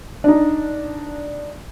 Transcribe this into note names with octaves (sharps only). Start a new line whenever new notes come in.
D4 D#4